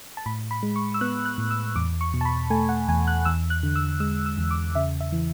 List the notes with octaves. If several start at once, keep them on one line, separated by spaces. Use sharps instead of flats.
A5
A2 B5
B5
G#3
C#6
E6
B3 F#6
F#6
A2
E6
E2 D6
C#6
B2
A5
B5
A3 G#5
F#5
E2 G#5
F#6
E2 E6
F#6
D3
E6
G#3 E6
E6
E2
D6
C#3 E5
E5
E3